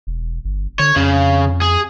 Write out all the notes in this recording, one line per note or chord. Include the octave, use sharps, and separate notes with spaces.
E1
G1
D3 C#5
F2 C#3
G#4